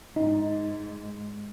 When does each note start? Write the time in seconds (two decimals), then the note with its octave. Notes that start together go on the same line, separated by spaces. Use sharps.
0.16 G#2 D#4